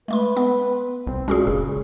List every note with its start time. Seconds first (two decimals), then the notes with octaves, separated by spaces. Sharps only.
0.08 G#3 A3 B4 C6
0.37 B3
1.07 C2 C4
1.28 A#2 G#3 C#4 F#4 G#4
1.47 F#1 C#3 G#4